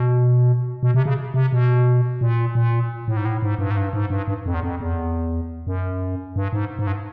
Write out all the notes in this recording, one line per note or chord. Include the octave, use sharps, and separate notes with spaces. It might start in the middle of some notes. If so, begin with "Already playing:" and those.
Already playing: B2
B2
C3
C#3
C3
B2
A#2
A#2
A2
G#2
A2
G#2
G2
G#2
G2
G#2
G2
G2
F2
E2
F2
E2
F#2
G2
G#2
G#2
G2